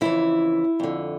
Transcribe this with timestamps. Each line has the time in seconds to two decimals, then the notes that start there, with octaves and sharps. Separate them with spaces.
0.01 F2 C#3 E3 E4
0.80 F2 D3